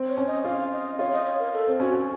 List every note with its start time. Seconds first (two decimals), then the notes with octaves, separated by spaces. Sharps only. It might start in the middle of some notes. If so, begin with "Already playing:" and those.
Already playing: C4
0.09 C#5
0.17 C#4
0.27 D#5
0.45 F4 F5
0.72 D#5
0.99 F4 C#5
1.12 D#5
1.26 C#5
1.39 A#4
1.53 A4
1.67 C4
1.80 C#4 F#4
1.94 C#4